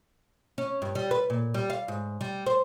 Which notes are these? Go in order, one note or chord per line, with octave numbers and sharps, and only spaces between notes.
C#4
G2
G3
B4
A#2
G3
F5
G#2
G3
C5